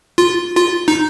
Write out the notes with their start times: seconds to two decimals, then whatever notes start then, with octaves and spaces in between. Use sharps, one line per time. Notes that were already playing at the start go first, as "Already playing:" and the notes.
0.18 F4
0.56 F4
0.88 D#4